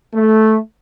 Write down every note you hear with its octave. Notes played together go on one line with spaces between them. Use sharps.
A3